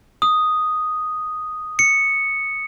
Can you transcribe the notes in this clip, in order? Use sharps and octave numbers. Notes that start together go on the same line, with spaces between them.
D#6
C#7